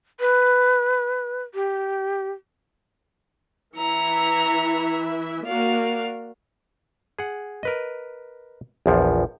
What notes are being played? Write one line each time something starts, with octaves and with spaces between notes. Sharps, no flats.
B4
G4
E3 E4 E5 A#5 C#7
A#3 F#4 D5 F5
G#4 F#5
A#4 B4 D#5
A#1 E2 F3